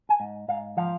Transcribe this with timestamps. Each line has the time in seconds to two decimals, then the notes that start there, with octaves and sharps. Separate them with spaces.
0.09 G#5
0.20 G#2
0.48 G#2 F5
0.77 F3 F5